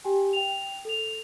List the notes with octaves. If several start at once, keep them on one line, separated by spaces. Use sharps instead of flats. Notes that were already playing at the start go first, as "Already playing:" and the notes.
G4 G5 G#5
G5 F7
A4 F7